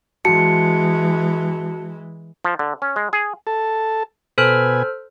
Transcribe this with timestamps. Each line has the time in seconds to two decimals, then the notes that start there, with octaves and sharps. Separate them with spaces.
0.25 E3 G#3 F#4 A5 C#7
2.45 F3
2.59 D3
2.82 C#4
2.96 G#3
3.13 G#4
3.47 A4 A5
4.38 B2 A4 B4 C5 G#5 F6